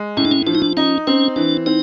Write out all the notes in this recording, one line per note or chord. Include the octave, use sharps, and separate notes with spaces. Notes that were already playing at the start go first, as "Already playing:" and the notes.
Already playing: G#3
A2 C#4
D4
C#4
F3 D4
D#4
D4
C#4 D#4
C4 C#4
E3 D4
C4 D#4